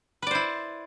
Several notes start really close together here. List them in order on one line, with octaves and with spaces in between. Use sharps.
B4 D5 C5 E4